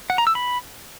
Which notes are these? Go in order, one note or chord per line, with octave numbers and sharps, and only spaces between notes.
F#5
A#5
E6
B5